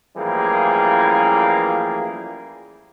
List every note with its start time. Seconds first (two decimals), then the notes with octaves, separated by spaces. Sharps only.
0.17 A1 E3 F3 G3 A#3 G#4